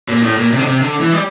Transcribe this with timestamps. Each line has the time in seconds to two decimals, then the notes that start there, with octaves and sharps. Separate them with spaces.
0.08 A#2
0.23 A2
0.37 A#2
0.52 C3
0.59 D3
0.66 C3
0.81 D3
1.00 E3
1.13 G3